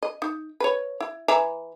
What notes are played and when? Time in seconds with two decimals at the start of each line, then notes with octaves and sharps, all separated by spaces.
0.03 D#5
0.22 D#4
0.60 B4 C#5
1.00 E4
1.28 E3 E5 A#5